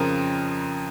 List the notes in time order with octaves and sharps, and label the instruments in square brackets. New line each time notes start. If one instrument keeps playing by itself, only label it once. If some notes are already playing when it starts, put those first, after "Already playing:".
Already playing: [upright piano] F2 C#3 F3 A#4